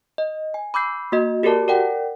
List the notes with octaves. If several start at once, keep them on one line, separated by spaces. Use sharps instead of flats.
D#5
G#5
B5 D6 E6 G6 C7
A#3 F#4 D#5
F#4 G4 A4 A#4 D5 A5
A#4 D5 F#5 G5